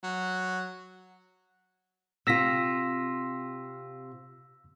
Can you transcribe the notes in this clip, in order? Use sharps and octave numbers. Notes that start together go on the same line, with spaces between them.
F#3
C3 F4 E6 A#6 B6